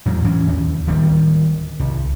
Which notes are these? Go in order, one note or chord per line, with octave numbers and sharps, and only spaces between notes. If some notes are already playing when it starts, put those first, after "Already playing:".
E2 G#2 F#3
A1 E3 C#4
D#2
D1 D#3 G3 C4
C2